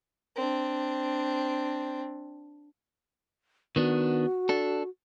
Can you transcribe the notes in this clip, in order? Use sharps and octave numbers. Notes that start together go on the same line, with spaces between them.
C4 D4
D#3 B3 D4 F#4
D4 A4